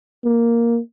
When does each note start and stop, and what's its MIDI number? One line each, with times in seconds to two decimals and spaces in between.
0.25 0.79 58